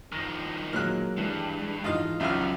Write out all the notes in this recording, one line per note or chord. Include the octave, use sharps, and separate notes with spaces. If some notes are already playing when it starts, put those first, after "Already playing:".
D#3 F3 F6 A#6
A#2 F#3 G#3 A#3 F6 F#6
G2 E3 G3 G#3
G#2 D#3 E3 F4 D#5 F5
C#2 F#2 F3 F4 E5 F6